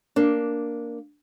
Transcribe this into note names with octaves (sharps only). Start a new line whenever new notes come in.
A#3 D4